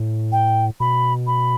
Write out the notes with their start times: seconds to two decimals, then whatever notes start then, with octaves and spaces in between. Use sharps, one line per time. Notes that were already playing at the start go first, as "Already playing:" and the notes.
Already playing: A2
0.32 G5
0.80 B2 B5
1.27 B5